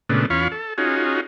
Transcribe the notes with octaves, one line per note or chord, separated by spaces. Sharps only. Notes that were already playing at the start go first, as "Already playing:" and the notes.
A#2 C#3 G#3 A3 B3 D4
E2 C#4 F4 F5 B5 C#6
A4
C#4 D#4 F4 F#4 G#4